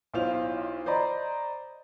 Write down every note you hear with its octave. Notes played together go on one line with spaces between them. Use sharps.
B1 E4 F4 C5 F7
C5 D5 D#5 A#5 B5